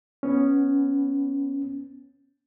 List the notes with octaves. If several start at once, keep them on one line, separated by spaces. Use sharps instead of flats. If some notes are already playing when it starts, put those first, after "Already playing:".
B3 C#4